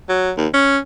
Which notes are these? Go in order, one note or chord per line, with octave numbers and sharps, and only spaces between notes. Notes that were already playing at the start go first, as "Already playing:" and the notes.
F#3
D#2
C#4